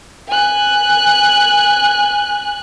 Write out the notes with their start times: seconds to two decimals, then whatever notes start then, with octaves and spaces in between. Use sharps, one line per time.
0.28 G#5 F#6